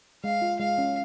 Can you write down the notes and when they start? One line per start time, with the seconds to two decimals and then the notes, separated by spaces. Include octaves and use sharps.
0.24 G#3 F5
0.42 F4
0.59 G#3 F5
0.78 C#4